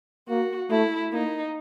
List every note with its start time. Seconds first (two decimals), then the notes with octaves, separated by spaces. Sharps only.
0.29 A#3 F#4
0.71 A3 E4
1.12 A#3 D#4